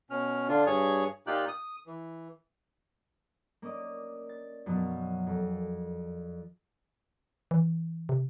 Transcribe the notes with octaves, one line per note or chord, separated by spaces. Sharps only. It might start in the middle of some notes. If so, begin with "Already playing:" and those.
B2 C#4 F6
D3 D4 F4
G2 G#4 C#5
A#2 D#4 F4 G4 G5 F#6
D#6
E3
A#3 C#4 D5 D#5
A6
F#2 B2 F3 F#3
F2
E3
C3